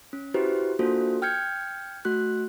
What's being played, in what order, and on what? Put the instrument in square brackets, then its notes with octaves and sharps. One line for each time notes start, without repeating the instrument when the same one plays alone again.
[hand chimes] C#4
E4 F#4 G4 B4 C5
A#3 D4 F4 F#4 A4 C5
G5 F6 G6 G#6 C#7
A3 F#4 F#6